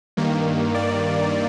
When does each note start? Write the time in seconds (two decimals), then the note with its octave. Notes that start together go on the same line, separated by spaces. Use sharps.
0.17 G2 D#3 A#3
0.75 D5